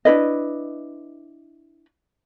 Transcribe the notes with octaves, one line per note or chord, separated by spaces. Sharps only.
D4 E4 B4 D#5